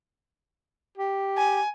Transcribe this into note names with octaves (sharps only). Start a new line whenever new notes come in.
G4
G#5